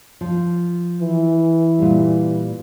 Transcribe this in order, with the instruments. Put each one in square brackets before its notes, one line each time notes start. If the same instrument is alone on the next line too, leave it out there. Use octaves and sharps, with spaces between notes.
[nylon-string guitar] F3
[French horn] E3
[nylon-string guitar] A#2 G3